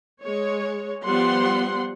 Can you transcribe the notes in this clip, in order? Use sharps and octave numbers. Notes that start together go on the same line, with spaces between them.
G#3 C#5
F3 G3 B3 F#5 C6